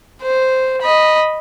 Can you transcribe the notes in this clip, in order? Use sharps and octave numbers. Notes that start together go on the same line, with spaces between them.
C5
D#5 B5